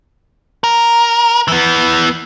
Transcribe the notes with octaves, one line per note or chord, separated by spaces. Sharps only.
A#4
E3 B3